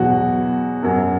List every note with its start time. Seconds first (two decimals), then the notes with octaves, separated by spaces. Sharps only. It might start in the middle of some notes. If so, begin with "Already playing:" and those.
Already playing: E2 B2 F#3 F#4
0.82 F#2 F#3